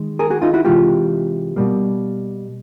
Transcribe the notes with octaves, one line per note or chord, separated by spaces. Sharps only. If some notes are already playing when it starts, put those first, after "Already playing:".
Already playing: D#3 G#3
G#4 A#4
F#4 G#4
D#4 F4
E4 F#4
C3 E3 G#3 F4 G4
B2 G3 A#3